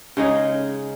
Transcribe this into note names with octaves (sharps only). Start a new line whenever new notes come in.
C#3 G#3 D#4 G#4